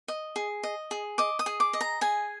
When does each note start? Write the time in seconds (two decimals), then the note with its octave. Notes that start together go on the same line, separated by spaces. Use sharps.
0.08 D#5
0.36 G#4
0.63 D#5
0.91 G#4
1.18 D#5 D6
1.39 D#6
1.46 G#4
1.60 D6
1.73 D#5
1.81 A#5
2.01 G#4 G#5